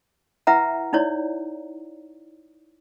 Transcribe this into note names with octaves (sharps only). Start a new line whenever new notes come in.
E4 B4 E5 F#5 A#5
D#4 E4 C#5 D5